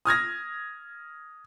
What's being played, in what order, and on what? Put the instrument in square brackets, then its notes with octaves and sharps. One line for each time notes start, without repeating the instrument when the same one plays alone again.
[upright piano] D#6 F6 G#6 A#6